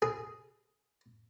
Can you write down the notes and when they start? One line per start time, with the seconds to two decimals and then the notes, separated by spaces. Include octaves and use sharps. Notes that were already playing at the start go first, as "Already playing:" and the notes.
0.02 G#4